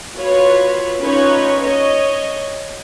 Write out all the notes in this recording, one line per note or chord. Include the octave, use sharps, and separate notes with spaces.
F4 F#4 B4 C#5
C#4 D#4 F4 B4 C#5
C#5 D#5